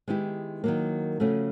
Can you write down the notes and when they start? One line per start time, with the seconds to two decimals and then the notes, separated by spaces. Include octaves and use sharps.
0.08 D#3 G#3 B3 E4 G4
0.64 D#3 F#3 A#3
1.20 C#3 F3 A3 C#4 F#4